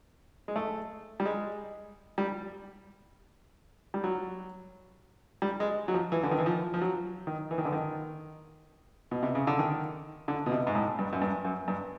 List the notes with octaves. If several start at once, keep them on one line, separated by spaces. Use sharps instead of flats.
G#3
A3
G3
G#3
G3
G3
F#3
G3
G#3
F#3
F3
E3
D3
D#3
E3
F3
F3
F#3
D#3
E3
D#3
D3
D#3
B2
C3
C#3
D3
D#3
D3
B2
C3
G#2
A2
G2
F#2
G2
F#2
G2